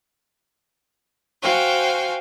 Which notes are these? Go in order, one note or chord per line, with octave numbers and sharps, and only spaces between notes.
F#4 C5 F5 G5 G#5